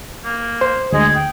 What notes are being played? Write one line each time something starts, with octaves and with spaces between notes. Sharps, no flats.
A#3
C5
D2 G#3 G#4
G5